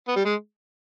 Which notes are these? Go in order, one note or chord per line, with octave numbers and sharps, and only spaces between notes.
B3
G3
G#3